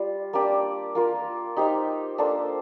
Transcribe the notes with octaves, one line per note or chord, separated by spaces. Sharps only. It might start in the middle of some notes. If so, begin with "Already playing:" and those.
Already playing: G3 F4
A#3 D4 G4 D5
A#3 F4 A#4
D#4 G4 C5 F5
A#3 D4 A4 C5